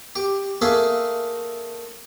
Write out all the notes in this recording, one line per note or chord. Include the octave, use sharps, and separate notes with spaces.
G4
A3 A#3 G#4 E5